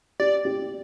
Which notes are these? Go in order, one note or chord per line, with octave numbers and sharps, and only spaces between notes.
G4 D5
G4